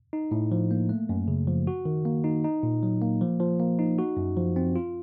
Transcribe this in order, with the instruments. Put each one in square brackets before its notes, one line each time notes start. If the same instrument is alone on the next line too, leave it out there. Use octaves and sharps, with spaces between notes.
[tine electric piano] D#4
A2
F3
A#3
A3
F#2
C#3
F3
F#4
D#3
A#3
D#4
D#4
A#2
F#3
A#3
F3
F3
A#3
D#4
F#4
F#2
F3
C4
F4